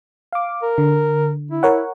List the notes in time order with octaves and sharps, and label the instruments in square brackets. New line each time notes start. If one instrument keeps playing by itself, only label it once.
[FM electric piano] F5 D6
[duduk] A#4
[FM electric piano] D3
[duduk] E4
[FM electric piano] A#4 C#5 F#5